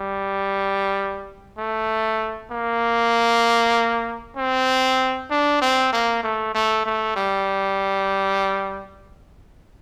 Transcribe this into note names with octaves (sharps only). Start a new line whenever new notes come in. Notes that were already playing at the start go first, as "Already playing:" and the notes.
Already playing: G3
A3
A#3
C4
D4
C4
A#3
A3
A3
A3
G3